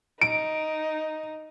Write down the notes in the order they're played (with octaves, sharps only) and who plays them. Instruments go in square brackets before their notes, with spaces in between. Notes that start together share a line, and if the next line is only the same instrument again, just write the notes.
[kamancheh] D#4 [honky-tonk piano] D7